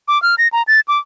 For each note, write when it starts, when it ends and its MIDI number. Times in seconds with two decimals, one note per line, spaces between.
0.08 0.21 86
0.22 0.35 89
0.38 0.48 94
0.53 0.63 82
0.67 0.80 93
0.88 0.99 86